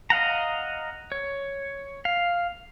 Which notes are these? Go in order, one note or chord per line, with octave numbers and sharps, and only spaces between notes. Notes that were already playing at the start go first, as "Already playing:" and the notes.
D#5 F5 F#5 A#5
C#5
F5